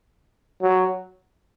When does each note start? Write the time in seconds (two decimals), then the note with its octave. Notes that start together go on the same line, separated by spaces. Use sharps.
0.62 F#3